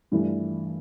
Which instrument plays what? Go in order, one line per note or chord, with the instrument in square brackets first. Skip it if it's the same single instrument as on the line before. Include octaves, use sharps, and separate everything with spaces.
[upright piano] G2 E3 A3 D4